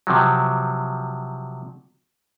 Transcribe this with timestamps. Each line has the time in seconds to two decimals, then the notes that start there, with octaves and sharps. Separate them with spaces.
0.07 C3 F3 F#3